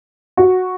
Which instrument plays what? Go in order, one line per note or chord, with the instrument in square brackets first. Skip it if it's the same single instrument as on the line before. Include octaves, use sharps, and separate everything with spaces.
[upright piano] F#4